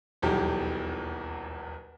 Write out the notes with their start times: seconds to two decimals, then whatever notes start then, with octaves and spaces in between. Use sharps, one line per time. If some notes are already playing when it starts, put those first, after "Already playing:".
0.22 D#1 B1 E2 G4